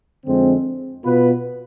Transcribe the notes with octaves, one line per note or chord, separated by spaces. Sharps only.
F2 D3 G#3 C4
B2 B3 F4 B4